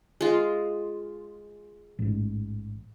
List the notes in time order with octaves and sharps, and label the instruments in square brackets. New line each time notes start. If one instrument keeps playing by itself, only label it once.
[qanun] G#3 F4
[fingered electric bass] A1 G#2